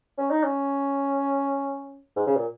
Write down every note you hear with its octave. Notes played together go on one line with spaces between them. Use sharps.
C#4
D#4
C#4
G#2
C#3
A#2